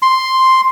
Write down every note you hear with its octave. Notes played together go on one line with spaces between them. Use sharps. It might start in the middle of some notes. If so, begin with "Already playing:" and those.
C6